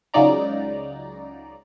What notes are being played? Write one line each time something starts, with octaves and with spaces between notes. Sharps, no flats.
C#2 C#3 F#3 D#4 D5 A#5